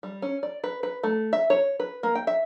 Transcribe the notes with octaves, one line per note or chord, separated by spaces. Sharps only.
G3
C#4
D5
B4
B4
A3
E5
C#5
B4
A#3
G5
E5